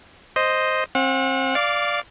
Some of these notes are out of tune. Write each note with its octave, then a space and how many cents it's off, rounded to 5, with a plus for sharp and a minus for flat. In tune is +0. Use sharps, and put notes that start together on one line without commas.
C5 +0 D#5 +0
C4 +30 F#5 -35
D5 +0 F5 +0 D6 -25